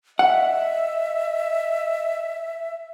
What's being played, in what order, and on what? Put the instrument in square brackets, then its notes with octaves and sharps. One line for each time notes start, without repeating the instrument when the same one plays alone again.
[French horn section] D#5 [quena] E5 [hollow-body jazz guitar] F#5